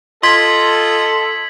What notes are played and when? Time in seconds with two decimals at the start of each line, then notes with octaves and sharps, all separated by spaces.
0.23 F4 A4 D#5 C6 G#6 B6 F#7